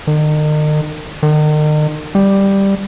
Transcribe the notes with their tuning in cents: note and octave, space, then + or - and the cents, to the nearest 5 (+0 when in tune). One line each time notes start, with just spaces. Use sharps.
D#3 -40
D#3 -40
G3 +5